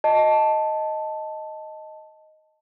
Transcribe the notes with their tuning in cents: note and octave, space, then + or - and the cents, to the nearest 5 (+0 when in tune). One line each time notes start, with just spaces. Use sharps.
D#5 +0 A5 +0